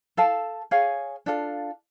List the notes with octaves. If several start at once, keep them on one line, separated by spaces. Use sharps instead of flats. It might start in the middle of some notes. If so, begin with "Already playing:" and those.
A4 F5 A5
G#4 C#5 F5 G#5
D4 F4 A4 F5